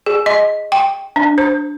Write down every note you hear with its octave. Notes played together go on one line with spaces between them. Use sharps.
G#4
D#5
G5
D4
C5